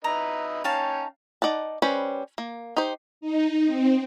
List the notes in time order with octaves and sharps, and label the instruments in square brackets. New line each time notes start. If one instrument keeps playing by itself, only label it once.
[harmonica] D#4 B4 E5 [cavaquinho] A#5
[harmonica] C#4 C#5 G5 [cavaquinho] D#4 F5 A5
[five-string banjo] D#4 D5 F#5 A5
G3 C#4 B4 C5
A#3
D#4 G4 C5
[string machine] D#4
C4